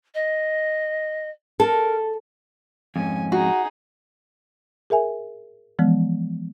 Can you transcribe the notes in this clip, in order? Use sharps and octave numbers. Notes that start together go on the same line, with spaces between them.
D#5
A4 A#4
F2 G#2 C#4 G#5
D#4 F#4 G#4
G#4 A#4 E5 G#5
E3 F3 G#3 B3